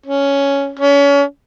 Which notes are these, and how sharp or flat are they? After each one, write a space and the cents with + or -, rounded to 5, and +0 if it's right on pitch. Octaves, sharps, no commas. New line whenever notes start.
C#4 +5
C#4 +30